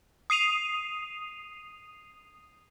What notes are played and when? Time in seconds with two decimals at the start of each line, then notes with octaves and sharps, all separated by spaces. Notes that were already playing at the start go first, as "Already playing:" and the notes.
0.30 D#6 C7 D#7 F7